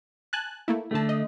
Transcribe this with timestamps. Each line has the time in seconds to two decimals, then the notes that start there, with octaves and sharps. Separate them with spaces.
0.33 G#5 A5 F#6
0.68 A3 A#3 E4
0.91 A#1 D#2 D3 A3 A5
1.09 D#5